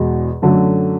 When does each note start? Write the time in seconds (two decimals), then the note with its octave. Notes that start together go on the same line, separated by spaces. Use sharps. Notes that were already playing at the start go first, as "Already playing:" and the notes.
Already playing: E2 B2 G#3
0.42 F#2 D3 F#3 A3